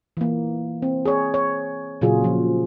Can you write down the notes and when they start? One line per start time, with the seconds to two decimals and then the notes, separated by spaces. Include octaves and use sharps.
0.17 E3 A#3
0.82 C4
1.06 G#4 C#5
1.34 C#5
2.01 A#2 C#3 F#3 F4 G#4
2.24 F3